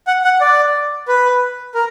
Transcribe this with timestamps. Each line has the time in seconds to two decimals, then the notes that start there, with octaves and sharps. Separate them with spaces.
0.07 F#5
0.24 F#5
0.41 D5
1.08 B4
1.74 A#4